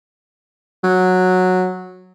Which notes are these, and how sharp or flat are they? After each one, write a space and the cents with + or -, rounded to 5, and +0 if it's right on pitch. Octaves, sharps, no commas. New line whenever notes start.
F#3 -10